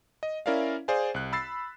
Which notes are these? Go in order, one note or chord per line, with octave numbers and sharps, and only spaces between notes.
D#5
C#4 E4 A#4 D5 E5 F5
G#4 C5 D5 F5 G#5
C2 F#6
B5 E6 A6 C7